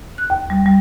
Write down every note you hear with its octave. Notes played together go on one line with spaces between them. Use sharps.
F#6
D#2
G3
G3